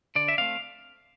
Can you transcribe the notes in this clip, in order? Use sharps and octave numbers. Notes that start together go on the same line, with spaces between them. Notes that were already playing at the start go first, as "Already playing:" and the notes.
D3 D5
E5
A3 C4 F5